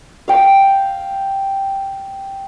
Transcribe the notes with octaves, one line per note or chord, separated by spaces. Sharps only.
F5 G5